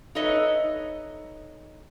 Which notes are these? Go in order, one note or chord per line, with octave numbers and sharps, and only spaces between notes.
D#4 A4 B4 C#5 D#5 E5